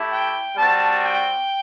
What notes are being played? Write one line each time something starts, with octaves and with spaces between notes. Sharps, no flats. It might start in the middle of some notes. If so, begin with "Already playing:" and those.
Already playing: A3 E4 G4
G5
G3 C4 F#4 A5
G5